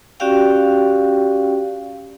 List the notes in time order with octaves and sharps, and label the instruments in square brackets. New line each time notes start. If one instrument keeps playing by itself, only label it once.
[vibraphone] C#4 F#4 G4 D5 F5 G5